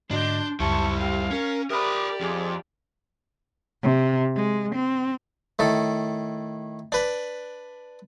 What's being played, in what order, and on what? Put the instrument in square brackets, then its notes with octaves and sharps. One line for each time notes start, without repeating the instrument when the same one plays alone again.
[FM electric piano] G#2 D3 F#4 [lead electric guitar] D4 [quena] D#5 [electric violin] C6 G6
[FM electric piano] C#2 F#2 [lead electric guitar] G3 E4 [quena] A5 [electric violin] C#6
[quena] G4 [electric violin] F5
[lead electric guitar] C#4 [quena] A#4
[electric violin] G4 D5 [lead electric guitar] A#4 B5 [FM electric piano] E5 A#5 [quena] D#6
[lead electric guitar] F2 [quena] G#4
[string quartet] C3
G#3
C4
[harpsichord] A2 D#3 A4
D4 B4